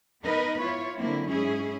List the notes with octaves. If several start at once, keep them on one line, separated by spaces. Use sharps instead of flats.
B3 D#4 A#4 B4 D#5
E4 F4 C#5
D3 F#3 A#3 C4 E4
G#2 C#4 E4 G#4